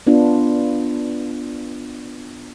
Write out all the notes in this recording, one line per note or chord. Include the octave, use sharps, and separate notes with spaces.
B3 D4 F4